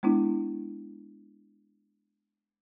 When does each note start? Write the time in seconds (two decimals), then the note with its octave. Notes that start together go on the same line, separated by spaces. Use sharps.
0.03 G#3 B3 D4 E4